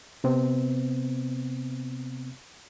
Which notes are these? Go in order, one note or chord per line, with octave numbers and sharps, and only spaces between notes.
C3 B3 C4